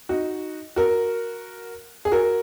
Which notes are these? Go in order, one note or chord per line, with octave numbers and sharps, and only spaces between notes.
D#4 F#4
F#4 A#4
G#4
F#4 A#4